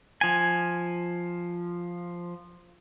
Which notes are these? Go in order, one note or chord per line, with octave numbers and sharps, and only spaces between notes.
F3 G#5